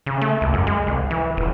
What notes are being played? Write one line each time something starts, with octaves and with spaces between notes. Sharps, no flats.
C#3
A3
C#2
F#2
G#3
C2
E3
D#1